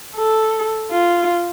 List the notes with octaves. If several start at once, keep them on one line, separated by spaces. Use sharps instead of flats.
A4
F4